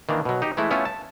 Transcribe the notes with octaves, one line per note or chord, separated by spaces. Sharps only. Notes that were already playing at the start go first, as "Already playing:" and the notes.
D#3 E3 A#3 D4
B2 F#3
D#4 G4
E3 G#3 A3 E4
A3 B3 C#4 E4 F4
A5